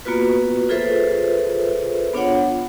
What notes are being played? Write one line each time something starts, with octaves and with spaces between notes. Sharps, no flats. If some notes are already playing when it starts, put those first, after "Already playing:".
A#3 B3 F4 F#4 B4
F4 G#4 A4 B4 C5 E5
B3 D4 F4 C#5 F#5